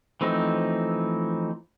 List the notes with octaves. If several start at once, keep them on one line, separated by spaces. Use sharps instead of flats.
E3 F3 A3 C4 D#4